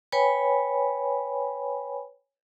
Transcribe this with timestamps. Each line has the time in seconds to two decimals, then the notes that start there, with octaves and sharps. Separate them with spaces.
0.12 B4 C#5 G5 G#5 B5